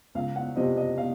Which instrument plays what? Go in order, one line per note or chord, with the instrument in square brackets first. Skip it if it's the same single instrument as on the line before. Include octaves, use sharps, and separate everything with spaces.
[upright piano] C#2 F5
F#5
C3 F3 D#5
D#5
F5